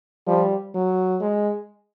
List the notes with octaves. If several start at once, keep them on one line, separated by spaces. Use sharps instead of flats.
F3 G3
F#3
G#3